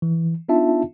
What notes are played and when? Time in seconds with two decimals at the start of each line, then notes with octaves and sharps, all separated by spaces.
0.02 E3
0.49 B3 D4 D#4 F4 E5 A5